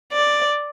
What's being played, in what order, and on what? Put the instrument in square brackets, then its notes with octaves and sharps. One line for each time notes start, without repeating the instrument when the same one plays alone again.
[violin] D5